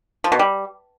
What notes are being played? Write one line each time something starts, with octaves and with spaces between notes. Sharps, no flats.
F3
B2
G3